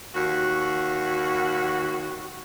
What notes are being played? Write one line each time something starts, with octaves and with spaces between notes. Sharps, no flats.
D#2 F#4